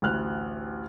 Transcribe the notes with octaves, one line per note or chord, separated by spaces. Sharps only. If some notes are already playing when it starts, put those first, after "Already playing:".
A1 D2 F6 F#6